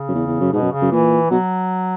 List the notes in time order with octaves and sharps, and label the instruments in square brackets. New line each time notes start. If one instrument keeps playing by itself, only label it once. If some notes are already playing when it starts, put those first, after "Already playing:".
Already playing: [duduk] C#3
[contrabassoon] F#2
E2
E2
F#2
[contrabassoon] G#2 [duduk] B2
[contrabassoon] F#2
[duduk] C#3
[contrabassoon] F#2
[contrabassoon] A#2 [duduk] E3
[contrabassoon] B2 [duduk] F#3